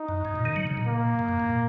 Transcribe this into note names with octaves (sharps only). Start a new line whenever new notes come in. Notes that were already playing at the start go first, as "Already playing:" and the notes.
Already playing: D#4
F#2
G#2
A#2
D#3
F#3
C#3
A#2
A#3
G#2
F#2
G#2
A#2